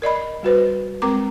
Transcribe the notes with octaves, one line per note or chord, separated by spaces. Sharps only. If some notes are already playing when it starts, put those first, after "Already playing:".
A#4 D5 D#5 B5
G3 F#4 B4 C5
G#3 C4 A#4 A#5 D6